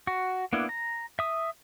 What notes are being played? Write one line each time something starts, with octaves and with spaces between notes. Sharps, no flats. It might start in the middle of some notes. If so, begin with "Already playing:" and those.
F#4
A#3 B3 D4 E4
A#5
E5 D#6